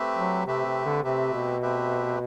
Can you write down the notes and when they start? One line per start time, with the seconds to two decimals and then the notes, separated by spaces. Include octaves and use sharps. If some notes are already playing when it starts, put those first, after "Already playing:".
Already playing: A3 C4 G4 B4 E5
0.17 F#3
0.46 C3 A3 C4 G4 B4 E5
0.65 C3
0.85 D3
1.04 C3 A3 C4 G4 B4 E5
1.33 B2
1.62 A3 C4 G4 B4 E5